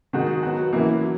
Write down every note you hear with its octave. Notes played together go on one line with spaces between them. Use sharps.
D#3 G#3 D#4 F#4
F#3 B3 F#4
E3 A#3 C#4 E4
F#3